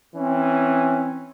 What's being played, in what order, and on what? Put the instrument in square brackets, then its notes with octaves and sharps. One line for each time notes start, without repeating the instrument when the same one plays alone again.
[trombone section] E3 C#4 [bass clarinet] C4